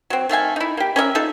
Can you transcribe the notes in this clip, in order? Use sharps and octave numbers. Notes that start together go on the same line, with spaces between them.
F#3 C4
D#3 A3 F5 G#5
D#4 E4
A#3 G4
C#4 A#4 D#5 E5
D#4 F4 A4